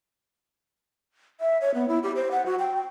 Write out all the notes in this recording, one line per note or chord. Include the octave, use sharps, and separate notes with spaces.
E5
C#5
B3
E4
G4
C5
F#5
F#4
G5
G5